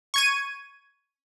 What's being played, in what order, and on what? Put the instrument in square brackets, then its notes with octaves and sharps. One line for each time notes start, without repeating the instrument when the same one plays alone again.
[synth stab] C#6 G#6 D#7